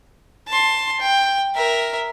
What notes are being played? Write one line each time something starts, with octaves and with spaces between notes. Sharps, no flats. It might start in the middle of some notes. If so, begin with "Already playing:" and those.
A5 C6
G5
A#4 E5